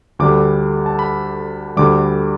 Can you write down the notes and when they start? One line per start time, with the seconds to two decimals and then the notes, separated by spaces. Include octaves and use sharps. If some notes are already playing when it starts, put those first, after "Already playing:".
0.19 D2 D3 G3 D6
0.86 A5
0.99 B5
1.77 D2 D3 G3 D6